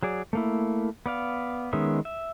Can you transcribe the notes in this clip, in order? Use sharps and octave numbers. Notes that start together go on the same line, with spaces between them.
F#3 G#4 D5
A3 A#3 E4
B3 D5 F5
D#3 G#3 B3 C#4 E5
E5